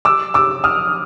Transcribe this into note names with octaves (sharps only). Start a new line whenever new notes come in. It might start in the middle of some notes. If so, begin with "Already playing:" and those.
D6 E6
D6 E6
D#6 F6